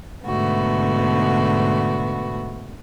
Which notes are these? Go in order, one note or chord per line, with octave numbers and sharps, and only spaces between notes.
G#2 B2 D3 A3 B3 F#4